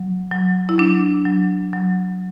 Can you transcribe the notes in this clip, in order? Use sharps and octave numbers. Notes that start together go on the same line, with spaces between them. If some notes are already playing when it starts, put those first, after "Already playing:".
Already playing: F#3
F#3
E4
F#3 D4
F#3
F#3